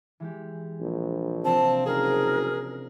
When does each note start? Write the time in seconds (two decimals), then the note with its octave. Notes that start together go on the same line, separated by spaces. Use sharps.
0.20 E3 G#3 G4
0.80 A#1
1.45 C3 F3 C4 D4 A5
1.86 F#1 G#4 A#4